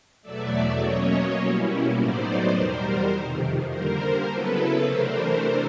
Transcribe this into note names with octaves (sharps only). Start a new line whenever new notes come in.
E2 B2 F#3 A3 D5 E5
B2 F#3 A#3 C#4 C#5 D#5
B2 G3 A#3 C#4 E4
A2 F#3 B3 D#4 C5 D5
E2 B2 G3 A#4 C5
F2 C3 D#3
D3 G3 A#3 A#4 C5
C#3 F#3 B3 E4 A4 B4
C3 E3 A3 D4 A#4 C5